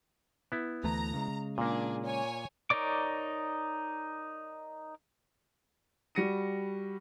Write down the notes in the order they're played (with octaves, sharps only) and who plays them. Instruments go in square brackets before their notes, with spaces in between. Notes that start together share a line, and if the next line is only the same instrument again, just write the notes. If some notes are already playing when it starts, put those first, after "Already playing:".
[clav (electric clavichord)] B3 E4
[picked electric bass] D2 E3 A3 [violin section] A#5
[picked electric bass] C#3 G#3
[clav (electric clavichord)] A#2 A#3 [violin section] D4 G#4
[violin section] C#5 G#5
[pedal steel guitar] D#4 A#4 C#5 D5 D6
[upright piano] G3 F#4 A#6 C#7 D#7